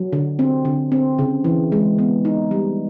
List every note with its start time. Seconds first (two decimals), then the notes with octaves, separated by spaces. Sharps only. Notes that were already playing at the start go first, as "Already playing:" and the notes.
Already playing: F#3
0.12 D3
0.39 C4
0.65 D3
0.92 C4
1.19 C#3
1.44 E3
1.72 G#3
1.99 B3
2.25 D#4
2.51 G3